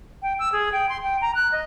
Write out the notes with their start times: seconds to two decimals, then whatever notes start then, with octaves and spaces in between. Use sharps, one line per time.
0.22 G5
0.39 E6
0.52 G#4
0.72 G5
0.89 C6
1.03 G5
1.21 A#5
1.35 F#6
1.52 D#5